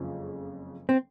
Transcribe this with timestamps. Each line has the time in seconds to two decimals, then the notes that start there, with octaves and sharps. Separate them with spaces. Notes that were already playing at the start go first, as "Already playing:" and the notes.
Already playing: F#1 F2 C#3 F3 G#3
0.89 C4